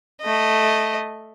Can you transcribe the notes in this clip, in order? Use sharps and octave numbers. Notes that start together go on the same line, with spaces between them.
A3 D#5